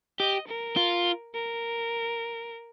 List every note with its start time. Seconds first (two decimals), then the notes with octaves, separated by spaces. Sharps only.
0.20 G4 D#5
0.47 A#4
0.76 F4
1.34 A#4